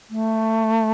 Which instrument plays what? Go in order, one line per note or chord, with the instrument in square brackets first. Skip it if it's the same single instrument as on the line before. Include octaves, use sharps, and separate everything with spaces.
[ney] A3